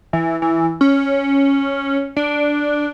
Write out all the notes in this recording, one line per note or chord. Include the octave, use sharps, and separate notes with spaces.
E3
E3
C#4
D4